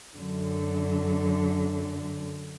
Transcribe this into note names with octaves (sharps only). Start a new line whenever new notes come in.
F#2 D3